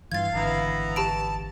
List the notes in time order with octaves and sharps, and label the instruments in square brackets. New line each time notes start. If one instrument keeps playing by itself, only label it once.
[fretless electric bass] G2 E3 [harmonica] F4 [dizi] F5 [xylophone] G#6 A6
[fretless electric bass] G#1 D3 E3 [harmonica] B3 E4 A#5
[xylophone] G4 B5 D7 [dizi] A5